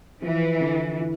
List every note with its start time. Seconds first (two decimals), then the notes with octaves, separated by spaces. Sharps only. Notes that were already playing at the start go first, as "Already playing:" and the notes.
0.22 E3 F3
0.61 D3
1.00 E4